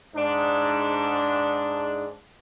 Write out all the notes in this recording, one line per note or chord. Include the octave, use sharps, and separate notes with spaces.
G#2 D4